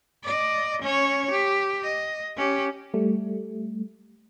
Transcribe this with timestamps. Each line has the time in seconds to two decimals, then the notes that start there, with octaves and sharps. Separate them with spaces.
0.23 D5 D#5
0.82 C#4 C#5
1.31 G4
1.83 D#5
2.37 C#4 G4
2.94 G3 A3